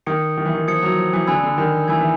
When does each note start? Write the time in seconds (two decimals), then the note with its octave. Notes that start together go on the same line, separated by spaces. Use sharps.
0.06 D#3 D#6 G#6 C#7
0.37 D#3
0.45 E3
0.55 D#3
0.68 F3 D#6 G#6 C#7
0.82 F#3
0.97 F3
1.13 E3
1.27 D3 G#5 B5 E6 G#6
1.44 D3
1.58 D#3
1.88 E3 G#5 B5 E6 G#6
2.01 E3